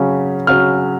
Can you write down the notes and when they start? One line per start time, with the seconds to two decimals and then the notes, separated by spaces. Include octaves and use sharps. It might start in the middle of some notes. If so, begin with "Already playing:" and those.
Already playing: C#3 F#3 C#4
0.47 C#3 F#3 C#4 F6